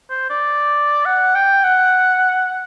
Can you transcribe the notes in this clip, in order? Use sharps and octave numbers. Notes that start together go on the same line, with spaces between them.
C5
D5
F#5
G5
F#5